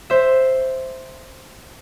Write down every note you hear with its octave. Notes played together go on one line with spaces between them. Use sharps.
C5 E5